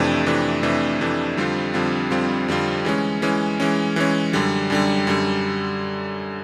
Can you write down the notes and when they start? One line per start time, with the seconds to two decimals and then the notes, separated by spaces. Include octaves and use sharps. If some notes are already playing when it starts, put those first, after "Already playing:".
Already playing: F2 C3 E3 A3 D4
0.26 F2 C3 E3 A3 D4
0.63 F2 C3 E3 A3 D4
1.00 F2 C3 E3 A3 D4
1.37 F2 D3 G3 C4 F4
1.74 F2 D3 G3 C4 F4
2.11 F2 D3 G3 C4 F4
2.48 F2 D3 G3 C4 F4
2.85 E3 G#3 C#4
3.22 E3 G#3 C#4
3.60 E3 G#3 C#4
3.96 E3 G#3 C#4
4.33 F#2 D3 G3
4.70 F#2 D3 G3
5.07 F#2 D3 G3